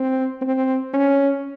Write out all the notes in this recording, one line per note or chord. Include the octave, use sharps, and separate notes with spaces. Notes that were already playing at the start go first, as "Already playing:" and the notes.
Already playing: C4
C4
C#4